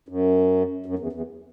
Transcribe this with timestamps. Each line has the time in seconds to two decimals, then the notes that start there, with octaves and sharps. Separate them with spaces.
0.08 F#2
0.86 F#2
0.99 E2
1.13 E2